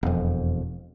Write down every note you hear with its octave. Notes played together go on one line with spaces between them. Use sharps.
E1 F2